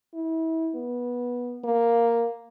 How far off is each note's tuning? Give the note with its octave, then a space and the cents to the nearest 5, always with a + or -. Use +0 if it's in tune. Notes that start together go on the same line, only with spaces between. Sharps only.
E4 -30
B3 -15
A#3 +0